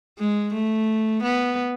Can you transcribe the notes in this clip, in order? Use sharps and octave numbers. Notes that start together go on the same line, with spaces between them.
G#3
A3
B3